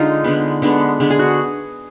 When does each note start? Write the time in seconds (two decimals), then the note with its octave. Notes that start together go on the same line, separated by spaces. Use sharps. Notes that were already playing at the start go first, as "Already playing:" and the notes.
Already playing: D3 G#3 D#4 F4
0.24 D3 G#3 B3
0.62 D3 G#3 B3
1.00 D3 G#3 B3
1.10 G#4
1.19 F#4